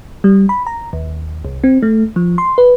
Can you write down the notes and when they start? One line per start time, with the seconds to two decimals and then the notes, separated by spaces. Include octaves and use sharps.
0.24 G3
0.49 B5
0.67 A#5
0.93 D#2
1.45 C2
1.64 C4
1.83 A3
2.16 F3
2.38 C6
2.58 B4